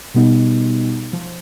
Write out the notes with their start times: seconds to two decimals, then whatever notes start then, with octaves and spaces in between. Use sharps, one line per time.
0.14 B2 G3 B3 D#4
1.13 F3